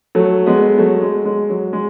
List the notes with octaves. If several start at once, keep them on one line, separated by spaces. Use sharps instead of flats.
F#3 A3
G#3 B3
F#3 A3
G#3
G#3
F#3
G#3